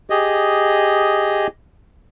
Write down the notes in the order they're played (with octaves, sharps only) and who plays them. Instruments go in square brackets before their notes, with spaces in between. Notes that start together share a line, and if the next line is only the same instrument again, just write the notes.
[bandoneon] G4 G#4 D#5